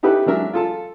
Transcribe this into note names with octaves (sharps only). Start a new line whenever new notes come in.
D#4 E4 G4 A4 B4
E3 F#3 G#3 D4 A#4 E5
F4 A4 A5